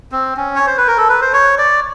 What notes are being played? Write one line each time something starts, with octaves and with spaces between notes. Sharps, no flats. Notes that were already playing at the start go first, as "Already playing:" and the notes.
C4
C#4
C#5
C5
B4
A#4
A4
B4
C5
C#5
D5